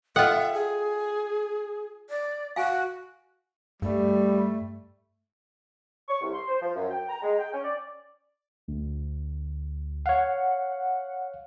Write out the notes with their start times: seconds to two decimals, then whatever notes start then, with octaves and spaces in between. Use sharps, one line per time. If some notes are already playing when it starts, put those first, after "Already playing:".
0.16 F4 A4 D#5 E5 F#5 G5
0.53 G#4
2.10 D5
2.56 F#4 F5 G#5
3.82 G2 G3 A3
6.09 C#6
6.21 C2
6.33 C6
6.48 C5
6.61 F3
6.75 F#2
6.91 G5
7.09 A#5
7.23 G#3
7.39 G5
7.52 C#4
7.64 D5
8.68 D2
10.06 C#5 F5 F#5